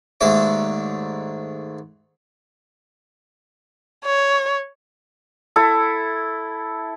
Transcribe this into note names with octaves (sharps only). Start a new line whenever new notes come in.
D#2 G#2 A3 D4 E5 D6
C#5
E4 A4